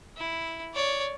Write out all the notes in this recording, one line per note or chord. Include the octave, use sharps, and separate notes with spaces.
E4
C#5 D5